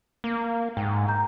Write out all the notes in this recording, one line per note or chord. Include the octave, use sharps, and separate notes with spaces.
A#3
G#2 G5
A#5 G6